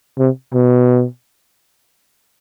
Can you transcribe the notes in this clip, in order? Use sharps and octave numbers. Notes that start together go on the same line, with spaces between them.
C3
B2